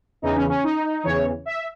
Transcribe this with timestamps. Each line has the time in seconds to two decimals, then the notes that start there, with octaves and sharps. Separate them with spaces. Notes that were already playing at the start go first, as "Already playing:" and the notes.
0.22 E2 C#3 E3 D#4
0.36 C#4
0.49 C#4
0.64 D#4
1.04 E2 C#3 E3 C#5
1.46 E5